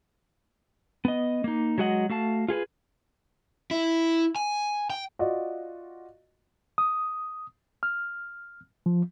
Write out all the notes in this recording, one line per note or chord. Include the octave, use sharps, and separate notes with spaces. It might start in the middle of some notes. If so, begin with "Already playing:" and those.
B3 D#5
A#3 D#4
F#3 G#3 F#4 D#5 F#5
A3 F#4 F5 A5
F4 G#4 A4 B4
E4
G#5
G5
F4 F#4 D5 D#5
D#6
F6
F3